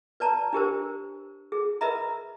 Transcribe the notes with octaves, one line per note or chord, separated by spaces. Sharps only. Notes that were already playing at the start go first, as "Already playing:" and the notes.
B4 D5 A5 A#5
D4 G4 A#4 C5
G#4
A#4 B4 D#5 E5 A#5 B5